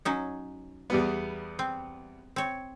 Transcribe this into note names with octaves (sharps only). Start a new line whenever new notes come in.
F#3 C#4 D#4
E2 G3 B3
C4
C4 C#5